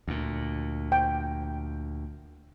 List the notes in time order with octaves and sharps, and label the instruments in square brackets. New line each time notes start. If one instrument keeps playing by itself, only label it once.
[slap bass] D2 A#2
[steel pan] G5